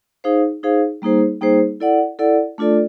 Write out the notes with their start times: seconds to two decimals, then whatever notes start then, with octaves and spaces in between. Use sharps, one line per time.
0.24 D#4 G#4 C5 F5
0.63 D#4 G#4 C5 F5
1.02 G3 A#3 D#4 G#4 C5
1.41 G3 A#3 D#4 G#4 C5
1.80 E4 A4 D5 F#5
2.19 E4 A4 D5 F#5
2.58 A3 D4 F4 A4 D5